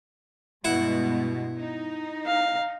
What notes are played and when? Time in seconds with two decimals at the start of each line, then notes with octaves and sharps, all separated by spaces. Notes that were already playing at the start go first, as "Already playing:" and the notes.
0.65 G2 B2 G#3 E4 E5 F#5
1.57 D#4
2.26 F5